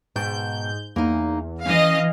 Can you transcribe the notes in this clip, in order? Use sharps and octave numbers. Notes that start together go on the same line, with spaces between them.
G#2 B2 G5 A5 G6
E2 A#3 D#4
E3 C#4 D#5 F5